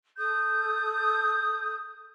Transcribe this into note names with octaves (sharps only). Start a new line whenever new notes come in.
A4 D#6 G6